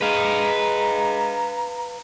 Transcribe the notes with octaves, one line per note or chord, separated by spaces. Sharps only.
G#3 B4 F5 A#5